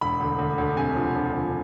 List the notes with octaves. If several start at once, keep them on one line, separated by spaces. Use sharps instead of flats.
E1 B5
D2
D2
D2
C3 G#5
F3
F3
D2